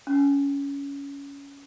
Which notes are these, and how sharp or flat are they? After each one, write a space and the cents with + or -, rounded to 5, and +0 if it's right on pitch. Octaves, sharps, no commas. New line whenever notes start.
C#4 +20